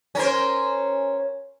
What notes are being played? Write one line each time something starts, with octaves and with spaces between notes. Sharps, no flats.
C#4 A#4 C5